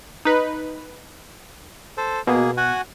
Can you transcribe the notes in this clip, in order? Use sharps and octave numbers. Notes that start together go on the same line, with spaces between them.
D#4 B4
A4 C5
B2 A#3 G#4
F#4 F#5 G#5